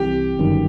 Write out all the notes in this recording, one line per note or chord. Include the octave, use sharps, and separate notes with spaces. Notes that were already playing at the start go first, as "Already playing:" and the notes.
Already playing: C2 C3 E3 G4
G1 F#2 D#3